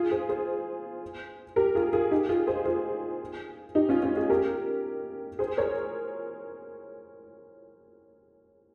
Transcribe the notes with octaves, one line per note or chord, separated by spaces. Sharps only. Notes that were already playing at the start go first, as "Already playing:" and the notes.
Already playing: F4 G#4
G#4 C5
G#4 C5
G4 A#4
F4 G#4
F4 G#4
D#4 G4
F4 G#4
G#4 C5
F4 G#4
D#4 G4
C#4 F4
C#4 F4
F4 G#4
G4 A#4
G#4 C5
A#4 C#5